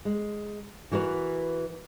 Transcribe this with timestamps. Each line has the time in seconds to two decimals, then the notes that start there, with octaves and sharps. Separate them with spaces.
0.05 G#3
0.91 E3 F#4 A#4 B4